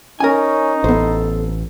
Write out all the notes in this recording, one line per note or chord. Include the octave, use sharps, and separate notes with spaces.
C#4 D#4 A#4 G#5
A1 B3 A4 C5